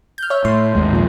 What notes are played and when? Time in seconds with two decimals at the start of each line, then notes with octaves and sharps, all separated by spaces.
0.18 F6 G6
0.30 C#5 E5
0.45 A2 C6
0.75 G#1 D#2 G#3
0.91 A#2 F3 A#3